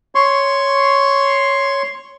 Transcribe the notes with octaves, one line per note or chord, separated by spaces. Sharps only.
C#5 C6 C#6